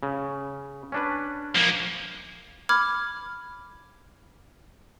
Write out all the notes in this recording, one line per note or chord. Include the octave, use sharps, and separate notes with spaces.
C#3
C#4 D4 B4
F3 A#3
B5 D6 F6 G#6